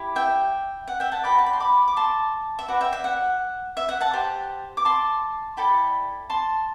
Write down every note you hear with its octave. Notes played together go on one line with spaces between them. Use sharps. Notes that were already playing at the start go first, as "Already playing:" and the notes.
Already playing: E4 G4
E5 G5
F#5
E5 G5
F#5 A5
F#4 A4 D5 G5 B5
A5
B5
C6
B5 D6
D6
A5 C6
E5
F#4 B4 D5 F#5
E5 G5
E5
F#5
E5
F#5
F#5 A5
G4 C5
D6
A5 C6
E4 A4 D5 G5 B5
A5 C6